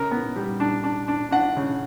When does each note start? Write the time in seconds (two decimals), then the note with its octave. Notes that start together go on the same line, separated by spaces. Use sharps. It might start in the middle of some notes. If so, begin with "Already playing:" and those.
Already playing: C#3 A#4
0.11 B3
0.36 G3
0.60 D4
0.84 D4
1.08 D4
1.31 D4 F#5
1.57 C#3